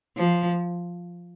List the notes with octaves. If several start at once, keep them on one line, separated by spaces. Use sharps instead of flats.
F3